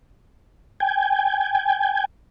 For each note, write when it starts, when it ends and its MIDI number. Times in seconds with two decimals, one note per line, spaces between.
0.80 2.05 79
0.80 2.05 80